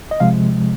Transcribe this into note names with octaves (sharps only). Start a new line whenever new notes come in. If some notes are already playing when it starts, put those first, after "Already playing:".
D#5
C3 F3 G#3 F5